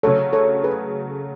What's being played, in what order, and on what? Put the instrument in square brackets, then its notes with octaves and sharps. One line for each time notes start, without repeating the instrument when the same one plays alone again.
[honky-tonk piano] C#3 F#3 A3 [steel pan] A4 C#5
[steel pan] A4 C#5
G#4 B4